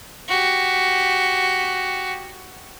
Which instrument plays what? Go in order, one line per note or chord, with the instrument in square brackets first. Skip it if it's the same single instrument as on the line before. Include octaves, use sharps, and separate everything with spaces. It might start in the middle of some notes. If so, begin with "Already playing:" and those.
[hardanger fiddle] F#4 G4